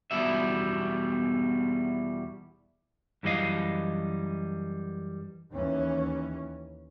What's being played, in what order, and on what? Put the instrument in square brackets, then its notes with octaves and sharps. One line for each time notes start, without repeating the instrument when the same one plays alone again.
[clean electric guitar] E2 B2 G3 E5
F#2 E3 G3 C4 D#5 F5
[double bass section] D#2 E3 C#4